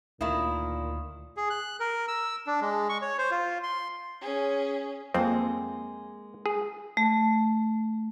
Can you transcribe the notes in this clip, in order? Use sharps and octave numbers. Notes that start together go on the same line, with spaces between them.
D2 A#2 D#3 E4 F5 D#6
G#4
F#6
A#4
E6
D4
G#3
C#6
C#5
C5
F4
C6
C#4 G#4
F2 G#3 A#3 C4
G#4
A3